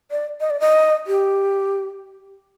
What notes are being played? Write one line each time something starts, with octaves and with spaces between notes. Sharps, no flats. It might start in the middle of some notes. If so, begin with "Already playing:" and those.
D5
D#5
D5
D#5
G4